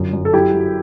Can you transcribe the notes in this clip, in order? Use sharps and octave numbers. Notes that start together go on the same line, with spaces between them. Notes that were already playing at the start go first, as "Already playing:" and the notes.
Already playing: G1 F#2
F#2
A4
F#3 E4 G4
F#3